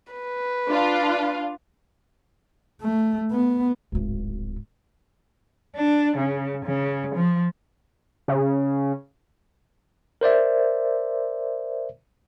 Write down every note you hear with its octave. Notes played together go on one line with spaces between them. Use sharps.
B4
D4 F4 F5
A3
B3
D1 G#1
D4
C#3
C#3
F3
C#3
A#4 C5 D5 E5